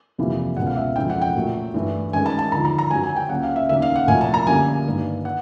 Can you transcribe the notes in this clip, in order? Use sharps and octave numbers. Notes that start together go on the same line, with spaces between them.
F2 C3 E3 G3 A#3
C#2 B2 G#3 F#5
F5
E5
F2 C#3 E3 G#3 G5
F#5
G5
A#2 F#3 A3
G2 E3 A3
F#2 D#3 G#3 G#5
A5
A5
D#2 D3 F3 A#5
A#5
A#5
F#2 C#3 F#3 G#5
G#5
G5
C#2 C#3 F#3 A#3 F#5
F5
E5
D#2 C#3 F#3 A#3 E5
F5
F#5
C2 A#2 F3 A3 G#5
A5
A#5
F#2 D3 G3 A#3 G#5
G2 D#3 G3 A#3
F#5